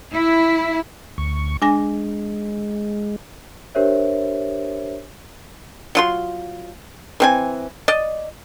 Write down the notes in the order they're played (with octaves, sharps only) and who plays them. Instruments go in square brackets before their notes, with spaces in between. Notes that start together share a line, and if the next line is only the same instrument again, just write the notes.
[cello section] E4
[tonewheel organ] D2 C#6
[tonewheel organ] G#3 [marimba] D4 G#5 A#6
[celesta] D4 G4 A#4 C5 C#5 E5
[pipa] F#3 F4 C6
E3 C4 G#5
D5 D#5